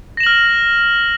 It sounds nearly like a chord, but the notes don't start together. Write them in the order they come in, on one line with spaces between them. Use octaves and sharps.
A#6 E7 F#7 F6